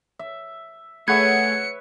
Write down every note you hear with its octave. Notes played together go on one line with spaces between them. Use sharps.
E5
A3 G#4 B4 C#5 E5 F#5 G#6 C#7